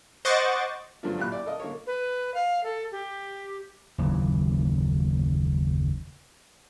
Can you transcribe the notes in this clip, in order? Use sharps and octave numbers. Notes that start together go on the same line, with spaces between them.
C5 D#5 F#5 C#6 D6 A6
G2 D3 F3 F#3 D4 F4
A1 A#2 G4 B5 F#6
D5
A4 A#4 D#5
D3 A#3 C#5
B4
F5
A4
G4
F#1 D#2 A#2 E3